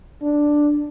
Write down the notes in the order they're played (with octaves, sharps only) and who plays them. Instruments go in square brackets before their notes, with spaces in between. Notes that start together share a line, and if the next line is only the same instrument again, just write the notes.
[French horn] D4